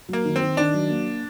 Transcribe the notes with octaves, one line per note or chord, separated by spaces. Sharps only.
F#3 A#3
D#3
C4
D#3
D#3 D4
F#3
A#3